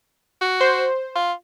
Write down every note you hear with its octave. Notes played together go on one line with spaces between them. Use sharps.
F#4
C5
F4